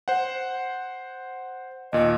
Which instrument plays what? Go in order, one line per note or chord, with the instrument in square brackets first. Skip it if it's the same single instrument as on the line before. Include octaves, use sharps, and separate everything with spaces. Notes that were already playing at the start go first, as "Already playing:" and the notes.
[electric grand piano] C5 F#5
[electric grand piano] D#2 A#2 [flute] D#5